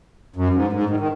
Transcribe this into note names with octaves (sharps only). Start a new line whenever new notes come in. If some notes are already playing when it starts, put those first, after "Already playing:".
F#2
G#2
G#2
D#3
D#3